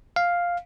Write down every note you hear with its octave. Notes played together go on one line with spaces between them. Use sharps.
F5